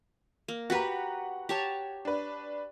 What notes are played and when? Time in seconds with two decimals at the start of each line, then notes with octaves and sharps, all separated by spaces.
0.48 A#3
0.70 F#4 G4 B4 F#5 A#5
1.49 G4 C#5 A5
2.05 D4 B4